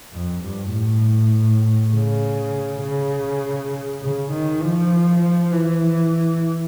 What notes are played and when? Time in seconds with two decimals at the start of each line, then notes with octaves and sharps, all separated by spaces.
0.13 F2
0.43 G2
0.73 A2
1.93 C#3
2.82 C#3
4.03 C#3
4.32 D#3
4.62 F3
5.52 E3